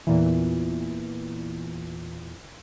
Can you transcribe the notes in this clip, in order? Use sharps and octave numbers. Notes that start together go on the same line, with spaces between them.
E2 A#2 E3